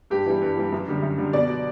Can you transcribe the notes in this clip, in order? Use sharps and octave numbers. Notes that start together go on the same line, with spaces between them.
G2 G4
E3 G3
G2
E3 G3
F#2
D3 G3
F#2
D3 G3
B2 D5
F#3